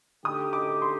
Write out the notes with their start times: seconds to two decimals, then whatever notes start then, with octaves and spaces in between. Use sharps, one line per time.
0.25 D3 A3 D#4 G4 D#6
0.53 D6
0.82 C6